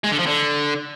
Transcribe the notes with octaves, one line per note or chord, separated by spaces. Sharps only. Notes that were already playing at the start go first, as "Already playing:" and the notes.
G#3
D3
F3
D3